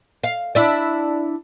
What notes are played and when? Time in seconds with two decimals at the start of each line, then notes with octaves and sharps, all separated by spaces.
0.24 F5
0.55 D4 E4 D5